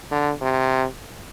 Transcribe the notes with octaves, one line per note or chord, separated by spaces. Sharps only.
D3
C3